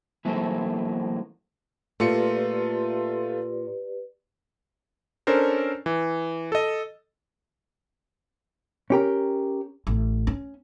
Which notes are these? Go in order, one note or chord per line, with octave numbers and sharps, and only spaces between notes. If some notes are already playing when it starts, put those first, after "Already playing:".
E3 F#3 A3 A#3 C4
A#2 A3 F4 G4 B4 D5 C#7
C#4 D4 A4 A#4 C5
E3
A4 D#5
C#4 G4 A#4
A1
C#4